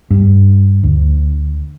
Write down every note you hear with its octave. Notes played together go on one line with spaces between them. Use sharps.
G2
D2